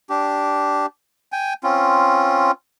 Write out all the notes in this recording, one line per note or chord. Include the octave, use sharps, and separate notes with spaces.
D4 G4
G5 G#5
C4 C#4 F4